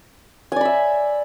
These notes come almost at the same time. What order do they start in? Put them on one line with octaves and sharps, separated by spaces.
G#5 D5 B5 E5